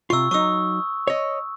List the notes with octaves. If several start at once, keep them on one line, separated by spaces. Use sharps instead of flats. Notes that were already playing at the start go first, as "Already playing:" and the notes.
C3 F4 C#6 E6
F#3 D#4 C#6 D#6 E6
C#5 D#5